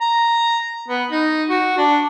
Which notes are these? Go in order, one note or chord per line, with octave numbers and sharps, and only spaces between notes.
A#5
B3
D#4
F#4
D4